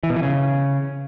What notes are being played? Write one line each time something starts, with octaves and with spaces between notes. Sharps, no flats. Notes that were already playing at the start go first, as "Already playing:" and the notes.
E3
B2
E3
C#3